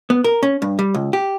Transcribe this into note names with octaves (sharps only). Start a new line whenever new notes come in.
B3
A#4
C#4
G2
G3
C#2
G4